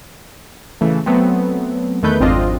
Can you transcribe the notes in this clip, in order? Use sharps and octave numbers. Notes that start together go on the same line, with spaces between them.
C#3 E3 A3
F#3 A3 B3 C4
E2 D#3 A3 B4 G6
G#1 F2 C4 D4 F4 D#5